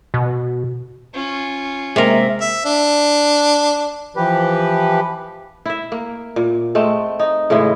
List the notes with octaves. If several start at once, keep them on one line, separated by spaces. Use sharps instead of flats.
B2
C#4 F4
C3 G#3 A#3 A#4 E5
E5
D4
E3 F3 G4 B4
E4 E5
A#3
A#2
G#3 A3 C4
D#4
A2 C#3 E3 G#3